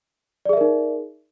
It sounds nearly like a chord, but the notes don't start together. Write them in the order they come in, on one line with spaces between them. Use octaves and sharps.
D5 G#4 E5 A#4 D#4